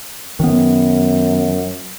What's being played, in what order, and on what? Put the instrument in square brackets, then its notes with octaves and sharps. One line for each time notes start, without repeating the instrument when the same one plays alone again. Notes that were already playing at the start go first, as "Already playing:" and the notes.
[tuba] F#2 [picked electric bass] D#3 B3